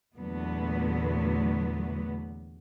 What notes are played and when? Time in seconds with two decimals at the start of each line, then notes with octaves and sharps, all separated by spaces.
0.16 E2 A#2 D3 F#3 A3 B3